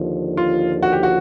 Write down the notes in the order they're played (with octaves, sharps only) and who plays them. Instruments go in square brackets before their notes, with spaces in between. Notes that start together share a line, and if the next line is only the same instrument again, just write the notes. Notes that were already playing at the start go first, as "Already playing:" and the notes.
Already playing: [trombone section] D#2 D3 F3
[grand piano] F4
F#4
G4
F#4